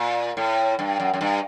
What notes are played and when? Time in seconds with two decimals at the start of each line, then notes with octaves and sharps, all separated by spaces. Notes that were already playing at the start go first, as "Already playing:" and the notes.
Already playing: A#2
0.37 A2
0.79 G2
1.00 F#2
1.14 F#2
1.21 G2